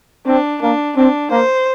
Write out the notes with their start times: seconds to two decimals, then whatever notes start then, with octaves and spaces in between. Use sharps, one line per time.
0.26 C4 D4
0.61 A#3 D4
0.97 C4 D4
1.31 A#3 C5